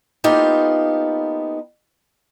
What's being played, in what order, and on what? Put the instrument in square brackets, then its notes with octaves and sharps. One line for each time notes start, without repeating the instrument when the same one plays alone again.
[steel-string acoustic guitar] A#3 B3 D#4 F4 G4 A4